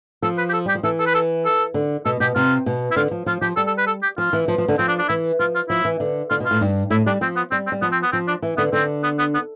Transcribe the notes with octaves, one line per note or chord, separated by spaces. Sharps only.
F3 A4
B4
G4
A4
G3 G4
F3
E3 A4
A4
B4
A4
A4
D3
B2 A4
B2 G4
C3 F4
B2
E4
D3 F4
F3
F3 F4
F3 G4
G3 A4
A4
B4
A4
G4
F3 F4
E3
F3
F3
D3
F3 C4
D4
D4
E3 E4
F3 F4
F4
F3 E4
E3
D3
D3 F4
B2
F4
A2
G2
A2 E4
G3 D4
F3 C4
B3
G3 C4
C4
G3
F3 B3
C4
B3
F3 C4
D4
E3
D3 B3
D3 C4
B3
B3
B3